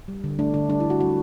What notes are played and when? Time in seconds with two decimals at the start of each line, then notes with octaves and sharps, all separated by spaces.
0.08 G3
0.24 D3
0.39 A3 D4
0.54 D3 D4
0.70 G3 D4
0.80 E4
0.85 D3 F#4
1.01 G3 F#4